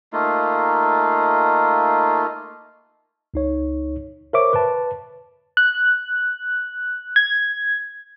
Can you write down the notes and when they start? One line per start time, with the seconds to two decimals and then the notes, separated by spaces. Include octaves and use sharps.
0.13 A3 A#3 D#4 F4
3.34 C#2 D#4 C#5
4.33 A#4 C5 C#5 E5 C#6 D6
4.53 B4 A5
5.57 F#6
7.16 G#6